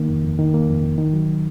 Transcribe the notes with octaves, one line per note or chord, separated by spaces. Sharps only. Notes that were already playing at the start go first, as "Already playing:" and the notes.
Already playing: D#3 A#3
F2
F2
D#3
A#3
F2
F2
D#3
F#3